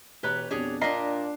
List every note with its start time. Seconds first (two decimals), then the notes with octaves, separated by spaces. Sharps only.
0.23 E1 G4 B4 C#5 A#5
0.51 F2 B2 D4 G4 G#4 C#5
0.81 A#2 D4 A#4 D#5 A#5 B6 C7